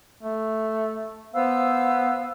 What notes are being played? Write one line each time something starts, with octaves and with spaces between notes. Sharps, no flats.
A3
B3 C5 F5 E6